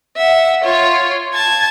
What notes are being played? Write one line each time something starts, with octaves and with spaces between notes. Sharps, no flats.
E5 F#5
F4 C#5
A5 G#6